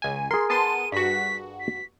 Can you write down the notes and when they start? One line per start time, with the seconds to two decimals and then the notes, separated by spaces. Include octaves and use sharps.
0.02 C#2 G#5
0.31 G#4 A#4 C6
0.50 B3 A5 C6 D#7
0.92 G2 F#4 B6
1.60 B6